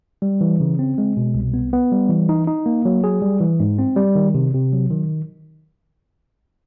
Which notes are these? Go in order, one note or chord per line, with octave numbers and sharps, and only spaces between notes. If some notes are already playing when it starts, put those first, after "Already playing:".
G3
E3
C#3
C4
G#3
B2
C2
B3
B3
G3
E3
D#4
D#4
A#3
F#3
G#4
G3
E3
G#2
C4
G3
D#3
C3
C3
F#3
D#3